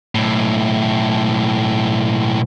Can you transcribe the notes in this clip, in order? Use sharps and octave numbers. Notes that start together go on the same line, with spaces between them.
B1 A2